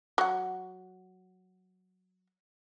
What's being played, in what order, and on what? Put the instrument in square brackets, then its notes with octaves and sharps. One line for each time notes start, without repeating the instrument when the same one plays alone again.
[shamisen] F#3 F#5